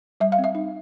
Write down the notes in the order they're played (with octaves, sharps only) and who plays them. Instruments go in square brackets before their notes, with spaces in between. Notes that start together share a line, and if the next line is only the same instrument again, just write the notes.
[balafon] G3 E5
F5
C4
E5
D#4